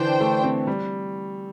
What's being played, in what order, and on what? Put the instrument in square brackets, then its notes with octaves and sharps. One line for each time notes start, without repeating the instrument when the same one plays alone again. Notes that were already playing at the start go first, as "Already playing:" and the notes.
Already playing: [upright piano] D3 E3 [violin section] D4 C5 G5
[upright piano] A3
C4
G3